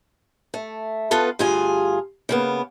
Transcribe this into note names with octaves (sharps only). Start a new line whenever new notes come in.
A3
B3 F4 A4 B4
D2 G2 F4 G#4 G#5
C#3 A#3 B3